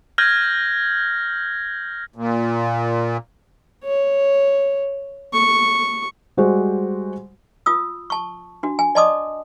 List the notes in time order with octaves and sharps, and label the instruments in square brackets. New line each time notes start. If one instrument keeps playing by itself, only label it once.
[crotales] F6 G6 G#6 A#6 F#7
[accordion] A#2
[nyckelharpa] C#5
C#6
[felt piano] G3 G#3 F#4 C5
[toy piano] F4 D#6 E6
A5 C#6
D4 F#4
G#5
D5 D#5 A5 C6 D6 D#6